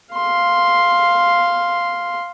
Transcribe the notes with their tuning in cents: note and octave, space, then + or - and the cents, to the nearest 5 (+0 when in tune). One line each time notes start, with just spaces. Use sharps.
F5 +0 C6 +0